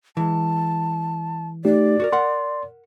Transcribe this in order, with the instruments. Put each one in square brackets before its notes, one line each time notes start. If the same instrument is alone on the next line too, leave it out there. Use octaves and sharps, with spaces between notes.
[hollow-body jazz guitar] E3 G#3 [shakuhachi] A5
[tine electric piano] A3 D#4 G4 [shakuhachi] D5
[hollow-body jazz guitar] F#4 A4 A#4
[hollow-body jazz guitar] A#4 F#5 [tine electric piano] C6